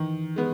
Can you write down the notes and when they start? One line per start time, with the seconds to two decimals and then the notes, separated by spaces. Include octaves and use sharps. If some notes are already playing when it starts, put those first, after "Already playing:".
Already playing: D#3 E3
0.36 G#3 B3